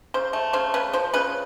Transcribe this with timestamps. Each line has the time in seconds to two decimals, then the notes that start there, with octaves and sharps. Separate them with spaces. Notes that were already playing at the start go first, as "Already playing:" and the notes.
0.14 C#3 C5
0.33 A3
0.53 C#3 C5
0.74 C#3 B4
0.93 F3 C5
1.14 C#3 B4